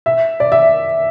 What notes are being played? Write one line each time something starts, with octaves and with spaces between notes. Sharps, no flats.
E5
D5
E5